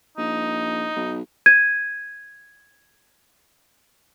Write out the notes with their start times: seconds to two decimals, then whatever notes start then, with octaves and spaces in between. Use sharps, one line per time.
0.18 A#1 D#4
0.96 B1
1.46 G#6 D#7